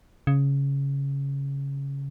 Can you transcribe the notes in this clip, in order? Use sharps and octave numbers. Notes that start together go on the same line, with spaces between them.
C#3